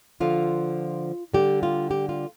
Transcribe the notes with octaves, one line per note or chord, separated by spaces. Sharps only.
D3 F3 F4
D3 G3 G4
F4
G4
F4